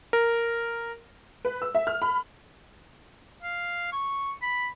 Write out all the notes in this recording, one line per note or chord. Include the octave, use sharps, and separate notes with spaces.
A#4
B4
E6
E5
F6
B5
F5
C#6
B5